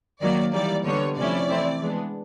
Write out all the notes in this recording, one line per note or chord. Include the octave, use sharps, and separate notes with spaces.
D#3 F#3 A#3 D5
E3 G3 A#3 D#4 D5
D3 G3 B3 C#5
C3 F3 A3 C#4 E4 D5
E3 A3 C4 E4
E3 G#3 B3 D4